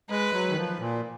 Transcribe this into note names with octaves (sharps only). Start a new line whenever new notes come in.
G#3 B4
F#3
D#3
F3
A#2